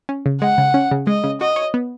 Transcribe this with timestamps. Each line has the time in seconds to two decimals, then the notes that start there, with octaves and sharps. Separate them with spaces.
0.09 C#4
0.26 C#3
0.42 G#3 F#5
0.58 C#3
0.74 C#4
0.91 C#3
1.07 G#3 D#5
1.24 C#3
1.41 F#4 D#5
1.56 C#5
1.74 B3